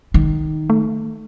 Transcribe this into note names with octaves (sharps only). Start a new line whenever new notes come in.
D#3
A3